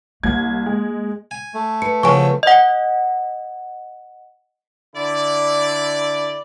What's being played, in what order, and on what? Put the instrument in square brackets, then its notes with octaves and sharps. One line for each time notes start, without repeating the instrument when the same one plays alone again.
[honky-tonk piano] C2 G#6 [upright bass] A#3
[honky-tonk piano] G#3
[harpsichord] G#5
[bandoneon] A3
[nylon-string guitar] B4 [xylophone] C#7
[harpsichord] C#3 F#3 B3 [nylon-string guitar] F3 [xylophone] G#5 C#6
[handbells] D#5 F#5
[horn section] D3 E4 D5